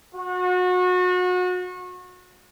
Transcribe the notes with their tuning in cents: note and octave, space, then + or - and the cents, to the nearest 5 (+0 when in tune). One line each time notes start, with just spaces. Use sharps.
F#4 -30